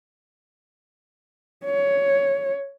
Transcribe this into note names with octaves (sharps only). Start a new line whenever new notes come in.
C#5